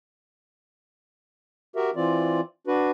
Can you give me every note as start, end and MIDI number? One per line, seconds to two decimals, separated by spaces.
1.76 1.90 66
1.76 1.90 67
1.76 1.90 70
1.76 1.90 76
1.96 2.41 52
1.96 2.41 60
1.96 2.41 65
1.96 2.41 74
2.67 2.91 62
2.67 2.91 66
2.67 2.91 71